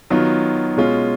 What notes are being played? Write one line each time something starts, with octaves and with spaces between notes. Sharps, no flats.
D#3 F#3 B3 F4
B2 G#3 C#4 F4